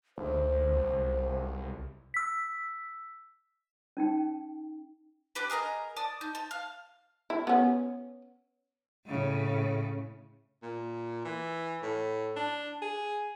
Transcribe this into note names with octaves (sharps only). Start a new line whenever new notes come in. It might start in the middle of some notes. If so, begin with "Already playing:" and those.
D2 C5
C2
E6 B6
C#4 D#4 G5
D4 G4 B4
G#4 A#4 D#5 A#5
D5 A5 D#6
D#4
A5
F5
E4
B3 C#4
A2 C#3
A#2
E3
A2
D4
G#4